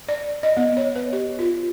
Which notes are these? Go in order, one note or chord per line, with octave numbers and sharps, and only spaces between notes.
D5
D#5
B3
C#5
B4
G4
F4